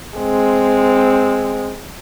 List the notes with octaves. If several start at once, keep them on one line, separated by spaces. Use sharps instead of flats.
G#3 C4